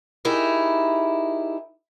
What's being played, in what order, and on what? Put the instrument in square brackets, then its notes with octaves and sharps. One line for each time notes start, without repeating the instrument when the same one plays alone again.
[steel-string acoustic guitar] D#4 E4 G4 G#4 A#4